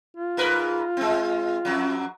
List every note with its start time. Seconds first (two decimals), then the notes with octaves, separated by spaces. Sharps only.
0.17 F4
0.37 G#2 A#4 B4
0.97 G#3 C4
1.65 F2 F#3